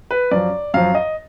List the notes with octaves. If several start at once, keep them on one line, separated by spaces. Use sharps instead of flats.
B4
F#2 F3 D5
F#2 F3 F5
D#5